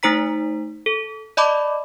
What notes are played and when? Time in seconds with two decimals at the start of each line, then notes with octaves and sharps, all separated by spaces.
0.03 A3 D#4 C5 A#5 B6
0.86 A4
1.37 D5 D#5 A5 B5 D6